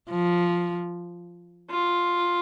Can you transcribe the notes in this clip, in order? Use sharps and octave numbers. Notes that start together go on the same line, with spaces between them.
F3
F4